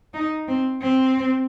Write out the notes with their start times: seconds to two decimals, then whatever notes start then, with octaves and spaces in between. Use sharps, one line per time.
0.14 D#4
0.48 C4
0.82 C4